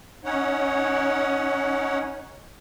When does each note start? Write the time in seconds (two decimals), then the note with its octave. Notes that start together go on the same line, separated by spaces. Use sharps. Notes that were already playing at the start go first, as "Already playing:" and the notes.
0.25 C#4 D#4 C#5 F#5